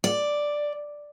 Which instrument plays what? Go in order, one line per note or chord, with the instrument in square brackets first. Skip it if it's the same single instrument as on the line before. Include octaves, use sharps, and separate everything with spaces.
[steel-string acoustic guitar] D5